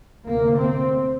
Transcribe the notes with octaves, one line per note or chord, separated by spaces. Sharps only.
D2 C3 A#3
C4